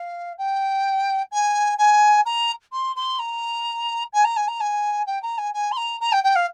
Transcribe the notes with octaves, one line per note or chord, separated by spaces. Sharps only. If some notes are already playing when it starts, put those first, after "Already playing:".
Already playing: F5
G5
G#5
G#5
A#5
C6
C6
A#5
G#5
A#5
G#5
A#5
G#5
G5
A#5
G#5
G#5
C6
A#5
A#5
G5
G5
F5